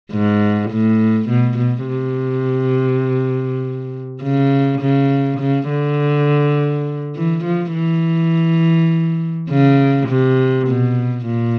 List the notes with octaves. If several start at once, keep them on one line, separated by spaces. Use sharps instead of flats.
G#2
A2
B2
B2
C3
C#3
C#3
C#3
D3
E3
F3
E3
C#3
C3
B2
A#2